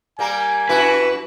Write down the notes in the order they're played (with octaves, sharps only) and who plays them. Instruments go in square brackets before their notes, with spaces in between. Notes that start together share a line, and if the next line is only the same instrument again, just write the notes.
[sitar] G3 A#3 A#4 [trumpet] G#5
[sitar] F#2 E4 F#4 [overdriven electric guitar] B4